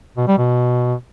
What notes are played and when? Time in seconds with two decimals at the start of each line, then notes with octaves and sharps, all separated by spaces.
0.17 B2
0.28 G3
0.38 B2